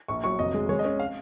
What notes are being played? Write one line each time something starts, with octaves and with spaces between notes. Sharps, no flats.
A#1 C#6
F#3 C#6
F1 D#5
G#3
G#3 C#5
D#5
C#4
F5